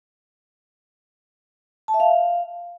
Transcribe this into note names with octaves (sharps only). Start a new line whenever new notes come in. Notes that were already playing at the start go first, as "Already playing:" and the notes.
A5
E5
F5